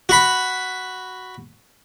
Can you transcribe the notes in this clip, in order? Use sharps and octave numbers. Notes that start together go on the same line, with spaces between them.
F#4 B5